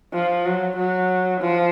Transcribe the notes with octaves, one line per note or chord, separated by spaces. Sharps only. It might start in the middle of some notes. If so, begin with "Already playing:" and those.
F3
F#3
F#3
F3